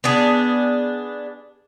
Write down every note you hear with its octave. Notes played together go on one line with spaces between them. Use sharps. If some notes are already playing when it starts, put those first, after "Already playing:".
B3 D4 G#4